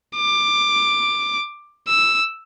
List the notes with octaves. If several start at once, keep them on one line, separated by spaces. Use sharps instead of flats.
D6
E6